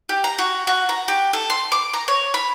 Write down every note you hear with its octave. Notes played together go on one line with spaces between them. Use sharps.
G4
A#5
F#4
F#4
A#5
G4
A4
C6
D6
A#5
C#5
B5